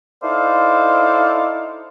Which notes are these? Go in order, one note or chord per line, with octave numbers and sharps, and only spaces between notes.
D#4 E4 A4 C5 D5 F5